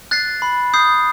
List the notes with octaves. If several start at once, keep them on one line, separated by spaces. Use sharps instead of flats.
F#6 A6 C7
B5
D#6 G6 C7